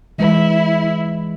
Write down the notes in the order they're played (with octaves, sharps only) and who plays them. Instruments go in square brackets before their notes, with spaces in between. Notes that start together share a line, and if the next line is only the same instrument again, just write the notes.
[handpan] E3 G#3 B4 [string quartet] E4